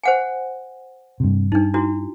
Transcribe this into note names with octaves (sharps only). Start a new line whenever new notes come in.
C5 F#5 G#5
G2 C3
G2 D4 D#4
D4 E4 F#4